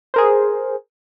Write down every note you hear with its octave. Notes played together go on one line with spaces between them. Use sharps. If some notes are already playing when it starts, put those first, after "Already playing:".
G#4 A#4 C5